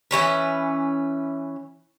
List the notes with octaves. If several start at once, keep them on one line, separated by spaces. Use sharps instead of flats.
E3 F#3 C#4 B4